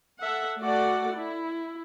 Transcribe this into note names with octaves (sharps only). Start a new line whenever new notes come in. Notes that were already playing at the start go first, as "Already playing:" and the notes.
A4 E5 F#5
A3 F#4 A4 D5 F#5
E4